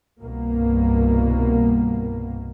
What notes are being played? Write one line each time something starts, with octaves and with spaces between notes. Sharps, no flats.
C2 G2 B2 A#3